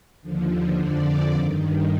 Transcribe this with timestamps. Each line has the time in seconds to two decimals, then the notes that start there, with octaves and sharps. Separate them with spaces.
0.22 D#2 D3 F3
0.79 F2 D3 F3 D5
1.35 G2 D#3